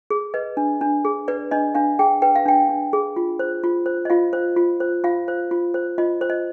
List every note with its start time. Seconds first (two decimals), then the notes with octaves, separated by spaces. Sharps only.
0.10 G#4
0.34 B4 D#5
0.57 D4
0.81 D4
1.05 G#4
1.28 B4 D5
1.51 D4 D#5
1.75 D4 F5
1.99 G#4 G5
2.22 B4 G5
2.35 F5
2.46 D4 G5
2.69 D4
2.93 G#4
3.16 F4
3.39 C5
3.64 F4
3.86 C5
4.05 D#5
4.10 F4 F5
4.33 C5
4.56 F4
4.80 C5
5.04 F4 F5
5.28 C5
5.51 F4
5.74 C5
5.98 F4 D#5
6.21 C5
6.30 D#5